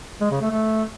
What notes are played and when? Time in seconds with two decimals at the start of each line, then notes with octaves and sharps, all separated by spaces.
0.21 G#3
0.31 C#3
0.41 A3
0.51 A3